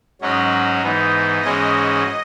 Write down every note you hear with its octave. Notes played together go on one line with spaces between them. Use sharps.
G#2 F#3 C#4 F#4 D#5
G#2 E3 B3 D#4
G#2 E3 G#3 C#4 F#4 D#5